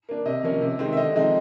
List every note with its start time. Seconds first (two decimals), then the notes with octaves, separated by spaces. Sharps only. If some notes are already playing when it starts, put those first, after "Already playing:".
0.09 A#3 D4
0.26 C3 D#5
0.44 F3 A#3 C#4
0.62 C3
0.79 D#3 G#3 C4
0.93 E5
0.97 D3 D#5
1.15 F3 G#3 C4 D#4